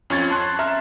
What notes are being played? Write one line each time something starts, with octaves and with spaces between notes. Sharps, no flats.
F2 C#4 F4 C#6 G#6 A6
A5 C6 F#6
E5 A#5 F6